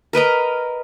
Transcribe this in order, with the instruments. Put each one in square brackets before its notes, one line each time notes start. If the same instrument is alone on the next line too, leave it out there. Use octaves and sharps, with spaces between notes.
[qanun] A#4 B4 D#5 A#5